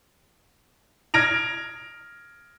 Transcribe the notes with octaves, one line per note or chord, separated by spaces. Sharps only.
F6 G#6 A#6 D7 F7